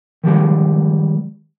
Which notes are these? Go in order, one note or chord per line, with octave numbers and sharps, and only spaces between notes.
D#3 F3 G3 G#3